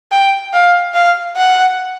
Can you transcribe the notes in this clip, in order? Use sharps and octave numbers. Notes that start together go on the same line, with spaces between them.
G5
F5
F5
F#5